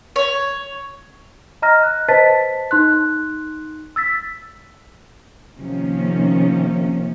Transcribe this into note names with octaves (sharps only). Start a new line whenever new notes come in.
C#5
D#5 A#5 F6 A#6
F#6
B4 C5 D#5 A5 A6 B6
D#4 C6 F#6
E6 A6 B6
C3 D#3 F3 A#3 C#4